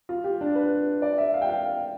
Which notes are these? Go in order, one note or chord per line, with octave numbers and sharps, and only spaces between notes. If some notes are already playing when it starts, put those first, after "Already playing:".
F4
G4
D4
B4
D5
E5
F5
G5
F5